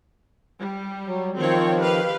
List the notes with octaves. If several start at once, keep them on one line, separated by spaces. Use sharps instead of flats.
G3
F#3
D#3 F3 C4 F4 C#5
G4 B4 F5